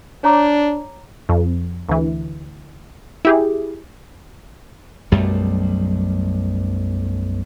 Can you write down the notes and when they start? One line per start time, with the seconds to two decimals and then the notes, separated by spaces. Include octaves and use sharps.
0.24 D4 C#5 A#5 D6
1.29 F2
1.89 D2 E3
3.25 E4 G4 G#4
5.12 B1 F#2 G3 A3